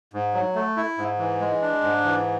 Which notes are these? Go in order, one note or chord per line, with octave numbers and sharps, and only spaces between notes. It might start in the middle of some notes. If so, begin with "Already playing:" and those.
G#2
F#3
A3
E4
G#2
E3
G#3
D4
G#2
E3